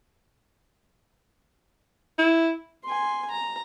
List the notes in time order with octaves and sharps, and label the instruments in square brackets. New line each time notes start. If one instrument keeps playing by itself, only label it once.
[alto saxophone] E4
[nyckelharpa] G#5 C6
A#5